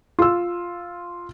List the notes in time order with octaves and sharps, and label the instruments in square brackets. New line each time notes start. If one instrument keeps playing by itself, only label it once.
[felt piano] F4 E6